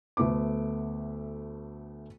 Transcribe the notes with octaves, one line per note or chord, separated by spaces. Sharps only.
D2 A3 B3 D6